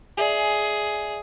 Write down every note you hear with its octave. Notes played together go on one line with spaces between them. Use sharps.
G#4 D5 E5 G#5